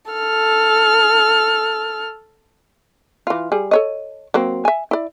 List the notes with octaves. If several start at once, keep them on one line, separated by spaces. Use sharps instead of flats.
A4 F6
E3 F4
G3 G#4
A4 C#5 D#5
F#3 A#3 C4
E5 G#5
E4 D5